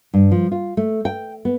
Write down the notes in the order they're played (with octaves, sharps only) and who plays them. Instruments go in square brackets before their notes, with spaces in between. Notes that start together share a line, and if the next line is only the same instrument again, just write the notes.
[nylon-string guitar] G2
F3
F4
A3
G5
B3